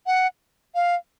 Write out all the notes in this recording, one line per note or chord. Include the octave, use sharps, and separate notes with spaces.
F#5
F5